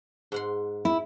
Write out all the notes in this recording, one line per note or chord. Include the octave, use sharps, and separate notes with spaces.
G#2 F#5 C6
E4